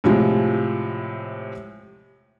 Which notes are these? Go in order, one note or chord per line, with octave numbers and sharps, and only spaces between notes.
A2 C3 F3 G#3